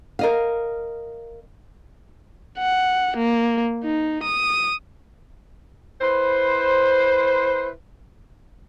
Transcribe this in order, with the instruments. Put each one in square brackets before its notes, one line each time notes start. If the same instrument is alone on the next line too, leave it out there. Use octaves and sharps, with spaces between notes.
[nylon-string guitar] A#4 D#5 F5
[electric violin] F#5
A#3
D#4
D#6
[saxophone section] E4 B4 C5